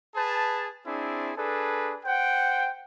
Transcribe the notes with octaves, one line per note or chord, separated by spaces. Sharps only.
G#4 B4 A5
C4 D4 E4 G#4
D4 G#4 A4 B4
C5 F#5 G5